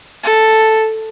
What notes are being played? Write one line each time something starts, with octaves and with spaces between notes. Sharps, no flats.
A4